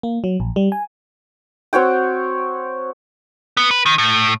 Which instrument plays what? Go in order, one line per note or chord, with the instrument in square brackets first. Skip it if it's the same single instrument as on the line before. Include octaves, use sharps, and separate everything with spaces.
[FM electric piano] A#3
F#3
A#1
G3
G#5
[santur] C4 F#4 C#5 G5
[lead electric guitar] B3
B4
D#3
A2